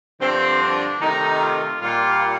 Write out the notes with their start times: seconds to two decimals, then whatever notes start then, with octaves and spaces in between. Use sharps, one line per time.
0.20 G2 D3 F3 C4
0.61 D4
1.00 C3 D#3 A3 D#4
1.40 F4
1.81 A#2 G3 F4